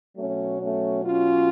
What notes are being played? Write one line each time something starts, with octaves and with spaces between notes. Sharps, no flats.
B2 F#3 A3 C#4
A3 C#4
C#4 F4